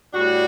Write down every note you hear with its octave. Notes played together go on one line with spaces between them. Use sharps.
A2 G3 D4 F#4